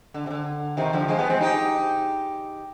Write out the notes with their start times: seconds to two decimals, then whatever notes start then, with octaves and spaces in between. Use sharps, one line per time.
0.14 D3
0.26 C3
0.31 D3
0.77 C3 D#3
0.93 D3 F3
1.08 F3 G#3
1.19 G3 B3
1.29 G#3 C4
1.40 D#4 G4